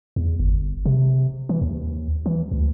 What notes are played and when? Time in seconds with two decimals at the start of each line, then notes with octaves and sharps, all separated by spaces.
0.16 E2
0.39 G1
0.86 C3
1.49 E3
1.62 D#2
2.26 E3
2.51 D2